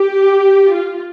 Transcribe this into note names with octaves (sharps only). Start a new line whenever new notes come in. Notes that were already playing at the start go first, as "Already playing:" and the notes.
Already playing: G4
F4